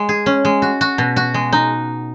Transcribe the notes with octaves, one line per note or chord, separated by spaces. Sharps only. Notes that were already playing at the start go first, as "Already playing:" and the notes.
Already playing: G#3
G#4
C#4
G#3
F#4
F#4
B2
F#4
G#3
D#4